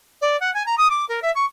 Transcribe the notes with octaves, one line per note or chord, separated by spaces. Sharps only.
D5
F#5
G#5
A#5
D#6
D6
A#4
E5
C#6